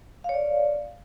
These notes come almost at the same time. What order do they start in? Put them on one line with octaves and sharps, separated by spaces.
F5 C#5 D5